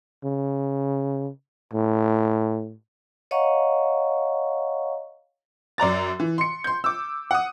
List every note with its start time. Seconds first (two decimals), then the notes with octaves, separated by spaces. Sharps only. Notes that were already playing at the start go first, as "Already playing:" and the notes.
0.24 C#3
1.73 A2
3.31 C#5 D#5 F5 F#5 A#5 C#6
5.78 F#2 D5 A#5 A6
6.20 E3
6.38 C6 C#7
6.64 C6 G6
6.84 D6 E6
7.31 F#5 D#6